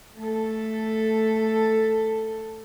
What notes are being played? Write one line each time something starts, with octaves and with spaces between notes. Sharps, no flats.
A3 A4